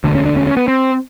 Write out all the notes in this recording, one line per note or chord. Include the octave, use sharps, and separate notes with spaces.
E1 D2 D3
C#4
D4
C#4
C#4
B3
C4